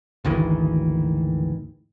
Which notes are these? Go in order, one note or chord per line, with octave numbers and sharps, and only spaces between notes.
G#1 D2 D#3 E3